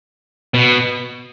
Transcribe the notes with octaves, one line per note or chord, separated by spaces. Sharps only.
B2